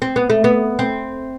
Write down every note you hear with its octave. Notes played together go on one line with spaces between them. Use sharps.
C4
B3
A3
B3
C4